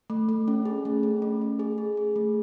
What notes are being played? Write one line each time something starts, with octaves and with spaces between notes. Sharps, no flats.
A3
A3
C#4
G#4
A3
C#4
A3
A3
G#4
G#4
G#4
A3